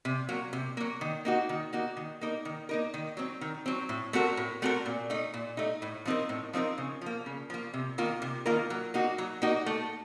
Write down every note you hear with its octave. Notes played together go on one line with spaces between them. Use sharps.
C3
F#3 A#3
C3
F#3 A#3
D#3
A#3 D#4 F#4
D#3
A#3 D#4 F#4
D#3
A#3 D#4 A#4
D#3
A#3 D#4 A#4
D#3
F#3 C4
D#3
F#3 C4
A2
A3 C4 F#4 A#4
A2
A3 C4 F#4 A#4
A#2
A3 D#4
A#2
A3 D#4
A2
F3 C4 D#4 A#4
A2
F3 C4 D#4 A#4
C#3
F3 A#3
C#3
F3 A#3
C3
D#3 A#3 F4 A#4
C3
D#3 A#3 F4 A#4
F#3
A#3 D#4 F#4
F#3
A#3 D#4 F#4
A3